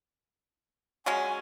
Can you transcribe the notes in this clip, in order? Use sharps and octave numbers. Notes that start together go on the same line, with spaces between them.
F#3 G#3 C#4 G#5